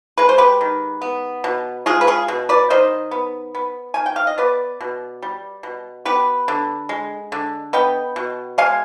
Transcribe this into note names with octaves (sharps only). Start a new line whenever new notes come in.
G#3 B4
C5
G4 B4
D#3
B3
B2
G#3 F4 G#4
B4
F4 G#4
B2
B4 D5
D#3 C5 D#5
B3
B3
D#3 G#5
G5
F5
D#5
B3 B4 D5
B2
G3
B2
B3 G4 B4
D3
G#3
D3
B3 D#5 G5
B2
G#3 F5 G#5